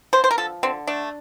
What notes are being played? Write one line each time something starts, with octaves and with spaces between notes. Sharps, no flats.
D3 C5
C5
A#4
F3 A4
D3 C4
A3 D4